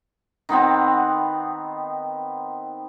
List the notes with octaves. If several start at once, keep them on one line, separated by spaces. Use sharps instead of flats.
D#3 B3 C4 F#5